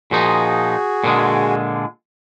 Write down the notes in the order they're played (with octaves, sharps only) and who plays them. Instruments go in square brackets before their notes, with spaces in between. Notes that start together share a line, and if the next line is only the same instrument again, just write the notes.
[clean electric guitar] A#2 F3 D#4 [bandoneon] F#4 G#4
[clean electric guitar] A#2 D3 G#3